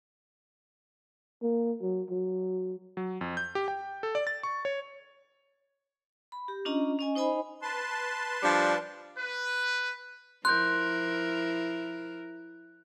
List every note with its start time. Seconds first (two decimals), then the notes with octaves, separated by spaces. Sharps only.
1.43 A#3
1.82 F#3
2.10 F#3
2.97 F#3
3.21 F2
3.37 G6
3.55 G4
3.68 G5
4.03 A4
4.15 D5
4.27 A6
4.43 C#6
4.65 C#5
6.32 B5
6.48 G4
6.65 C#4 D4 F4 D#5 A#5
6.99 C#4 D#5 G#5
7.15 D#4 C5 D#5 G#5 B5
7.62 B4 A5 C6
8.42 F3 G3 D4
9.17 B4
10.45 F3 E4 A#4 C6 F#6 G6